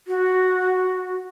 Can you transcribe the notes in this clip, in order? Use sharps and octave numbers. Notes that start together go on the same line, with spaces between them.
F#4